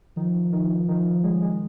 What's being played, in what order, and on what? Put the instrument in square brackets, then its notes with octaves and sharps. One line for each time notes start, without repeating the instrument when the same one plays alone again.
[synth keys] D#3 [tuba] F3
[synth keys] D#3
D#3
D#3
D#3
D#3
G#3
G#3